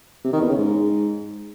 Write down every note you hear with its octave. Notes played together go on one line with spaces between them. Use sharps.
C3
D#3
E2
C#3
G#2